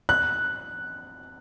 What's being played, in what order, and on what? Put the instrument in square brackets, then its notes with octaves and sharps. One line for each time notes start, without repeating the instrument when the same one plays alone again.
[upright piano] F#6